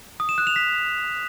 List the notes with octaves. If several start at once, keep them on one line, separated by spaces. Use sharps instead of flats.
D#6
E7
F#6
F7
B6